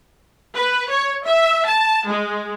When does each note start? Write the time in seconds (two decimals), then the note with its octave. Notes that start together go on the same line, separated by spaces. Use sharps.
0.55 B4
0.87 C#5
1.23 E5
1.64 A5
2.07 G#3